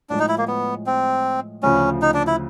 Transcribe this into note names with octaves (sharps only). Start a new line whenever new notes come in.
A2 F3 G#3 D4
D#4
E4
A#3
B3
C4
D2 C#3 F3 C#4
D#4
D4
E4